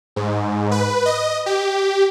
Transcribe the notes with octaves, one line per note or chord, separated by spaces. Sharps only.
G#2
B4
D#5
G4